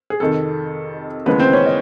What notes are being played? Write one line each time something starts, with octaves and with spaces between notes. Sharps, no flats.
G#4
F2 C3 D#3 A4
D#2 C#3 E3 G#3 B3 B4
C4 C5
C#4 C#5
D#5